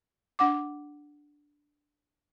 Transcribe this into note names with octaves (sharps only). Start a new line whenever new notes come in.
D4 F#5 D6